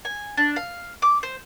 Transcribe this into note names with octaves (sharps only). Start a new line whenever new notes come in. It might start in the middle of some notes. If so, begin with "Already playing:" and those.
G#5
D4
F5
D6
C5